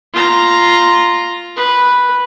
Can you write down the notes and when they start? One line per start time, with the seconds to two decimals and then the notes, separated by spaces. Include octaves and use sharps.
0.14 F4 A#5
1.56 B4